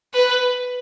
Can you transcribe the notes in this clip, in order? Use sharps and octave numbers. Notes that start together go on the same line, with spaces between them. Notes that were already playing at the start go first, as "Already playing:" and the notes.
B4